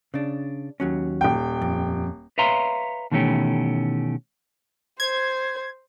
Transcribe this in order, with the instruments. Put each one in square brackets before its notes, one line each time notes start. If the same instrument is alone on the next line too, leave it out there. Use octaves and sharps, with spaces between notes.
[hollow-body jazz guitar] C#3 D4
D#2 F#3 C#4
[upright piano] D#1 G5
[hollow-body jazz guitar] F2
[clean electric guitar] B4 C#5 E5 F5 A#5 C6
B2 D#3 E3 A3 C#4 G4
[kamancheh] C5 [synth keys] G#6